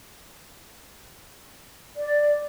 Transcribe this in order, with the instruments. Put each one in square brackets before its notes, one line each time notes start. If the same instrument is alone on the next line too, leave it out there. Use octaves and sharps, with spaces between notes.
[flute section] D5